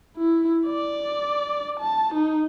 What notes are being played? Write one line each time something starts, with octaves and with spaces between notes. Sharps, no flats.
E4
D5
A5
D#4